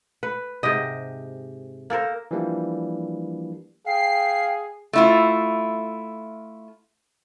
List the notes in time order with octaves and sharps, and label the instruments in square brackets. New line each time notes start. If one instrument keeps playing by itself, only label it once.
[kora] B4
G#2 C3 G4 D#5
A#3 A4 A#4 C5
[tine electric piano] E3 F3 G3 A#3 D4
[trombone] G#4 [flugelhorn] F5 [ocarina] G5 [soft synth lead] C7
[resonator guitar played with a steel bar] A3 E4 F4